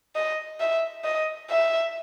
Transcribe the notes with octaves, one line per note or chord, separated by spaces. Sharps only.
D#5
E5
D#5
E5